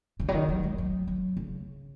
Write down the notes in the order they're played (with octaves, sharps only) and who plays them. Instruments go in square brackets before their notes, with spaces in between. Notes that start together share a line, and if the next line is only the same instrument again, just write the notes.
[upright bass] C#3
F#3
D#3
F#3
G#3
F#3
F#3
C#3